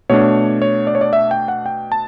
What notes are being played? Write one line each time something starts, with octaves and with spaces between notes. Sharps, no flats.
B2 A3 D4 C#5
C#5
D5
C#5
D5
E5
G5
F#5
G5
A5